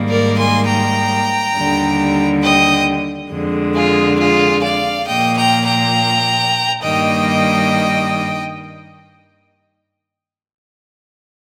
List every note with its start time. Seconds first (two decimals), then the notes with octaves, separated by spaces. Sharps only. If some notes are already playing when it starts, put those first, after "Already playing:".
Already playing: G#2 D#3 G3 A#3
0.09 A#4 D5
0.37 G#5 C6
0.67 G5 A#5
1.55 D#2 D3 G3
2.43 D#5 G5
3.31 F2 D3 G#3
3.75 F4 G#4
4.19 F4 G#4
4.64 D5 F5
5.07 A#2 F3 A#3 D#5 G5
5.37 G5 A#5
5.66 G5 A#5
6.83 G2 D#3 G3 A#3 D#5 G5